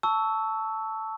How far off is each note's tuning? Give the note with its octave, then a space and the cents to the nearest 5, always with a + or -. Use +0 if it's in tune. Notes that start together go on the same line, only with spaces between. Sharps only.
A5 +0 C#6 +20 E6 -10